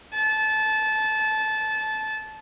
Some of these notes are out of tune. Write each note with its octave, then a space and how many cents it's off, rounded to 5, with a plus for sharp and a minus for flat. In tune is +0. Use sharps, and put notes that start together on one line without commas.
A5 -20